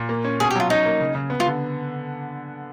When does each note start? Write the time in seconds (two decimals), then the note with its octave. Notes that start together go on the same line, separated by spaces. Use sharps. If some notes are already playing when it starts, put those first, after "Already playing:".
Already playing: A#2
0.09 A#3
0.25 C#4
0.40 B2 G#4
0.51 G4
0.56 F#3 F4
0.70 C#4 D#4
0.86 A#3
1.00 C#3
1.15 C#3
1.30 B3
1.40 F4
1.46 D3